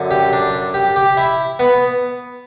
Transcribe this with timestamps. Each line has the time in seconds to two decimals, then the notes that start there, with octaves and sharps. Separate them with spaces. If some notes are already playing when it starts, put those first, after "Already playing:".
Already playing: F#2 D3
0.11 G4
0.33 D4
0.74 G4
0.96 G4
1.17 E4
1.59 B3